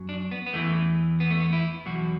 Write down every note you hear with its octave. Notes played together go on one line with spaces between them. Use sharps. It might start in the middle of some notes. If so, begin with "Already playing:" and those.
Already playing: F#2 F#3
D4
B3
B3
E2 E3 A3
B3
A3
B3
E4
E2 B2 F#3 F#4